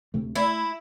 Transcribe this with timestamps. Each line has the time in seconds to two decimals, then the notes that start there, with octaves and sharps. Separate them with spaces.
0.14 D2 C3 A3
0.36 A3 E4